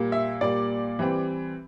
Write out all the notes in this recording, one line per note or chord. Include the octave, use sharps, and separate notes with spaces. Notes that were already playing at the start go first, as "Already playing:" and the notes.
Already playing: A#2 G3 A#3
E5
A#2 G3 A#3 D5
E3 G3 C4